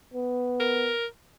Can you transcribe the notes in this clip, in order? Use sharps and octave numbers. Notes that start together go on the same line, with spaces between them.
B3
A#4